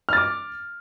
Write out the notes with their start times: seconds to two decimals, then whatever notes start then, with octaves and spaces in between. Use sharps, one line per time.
0.09 F6
0.13 A6
0.17 D6